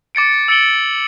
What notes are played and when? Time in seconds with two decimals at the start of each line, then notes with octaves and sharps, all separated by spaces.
0.15 D6 A6 C#7 D7
0.48 E6 A6 C#7 D7 F#7 G7